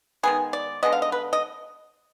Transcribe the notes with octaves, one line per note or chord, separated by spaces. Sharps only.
D#3 G#3 B3 G#4
D5
D3 G#3 B3 D#5
F5
D#5
B4
D#5